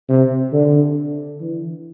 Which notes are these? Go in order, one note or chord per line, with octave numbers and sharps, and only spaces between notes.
C3
D3
E3